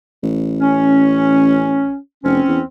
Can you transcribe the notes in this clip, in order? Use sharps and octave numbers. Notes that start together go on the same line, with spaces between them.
A1
C#4
F1 C4 C#4
E2